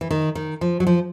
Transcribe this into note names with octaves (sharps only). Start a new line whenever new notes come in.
E3
D#3
D#3
F3
F#3
F3